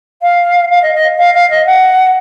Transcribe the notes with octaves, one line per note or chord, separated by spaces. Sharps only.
F5
F5
D#5
D#5
F5
F5
D#5
F#5